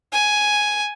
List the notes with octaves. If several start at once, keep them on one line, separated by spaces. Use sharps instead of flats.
G#5